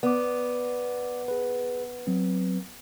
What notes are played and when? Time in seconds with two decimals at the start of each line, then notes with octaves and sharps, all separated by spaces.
0.03 B3 D5 D6
1.28 G#4 B4
2.07 F#3 C4